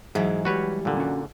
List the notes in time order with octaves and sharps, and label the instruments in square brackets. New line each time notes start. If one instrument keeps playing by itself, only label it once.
[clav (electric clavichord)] G#2 [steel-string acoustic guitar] E3 F#3 [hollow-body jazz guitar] G#4 D#5 E5
[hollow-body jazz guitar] G3 G#3 G4 [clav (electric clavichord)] F#4 B4 C#5
[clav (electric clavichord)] A#2 D3
[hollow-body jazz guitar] C#4 F#4